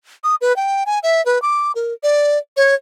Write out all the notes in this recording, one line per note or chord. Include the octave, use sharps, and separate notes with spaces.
D#6
B4
G5
G#5
E5
B4
D6
A#4
D5
C#5